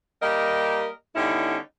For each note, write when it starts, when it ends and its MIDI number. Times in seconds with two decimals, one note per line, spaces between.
0.22 0.89 55
0.22 0.89 58
0.22 0.89 67
0.22 0.89 70
0.22 0.89 75
1.16 1.56 50
1.16 1.56 55
1.16 1.56 59
1.16 1.56 61
1.16 1.56 63
1.16 1.56 64